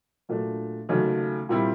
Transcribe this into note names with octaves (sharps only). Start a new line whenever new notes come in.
A#2 F#3 A3 D4
D#2 C#3 F#3 A3
A#2 G3 C4 E4